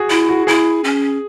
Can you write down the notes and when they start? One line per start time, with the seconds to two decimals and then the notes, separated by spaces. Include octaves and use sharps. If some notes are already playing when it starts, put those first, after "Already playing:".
Already playing: F#4 G#4
0.10 E4
0.29 F#4
0.47 E4 G#4
0.84 C#4